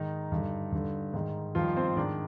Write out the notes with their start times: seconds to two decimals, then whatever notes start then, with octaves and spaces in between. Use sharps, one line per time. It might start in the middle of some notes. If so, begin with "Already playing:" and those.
Already playing: G#2 D#3 D#4
0.32 G2 D3
0.72 G2 D3
1.14 G#2 D#3
1.55 G2 D#3 F3 F4
1.76 C4 C5
1.96 G#2 D#3 D4 D5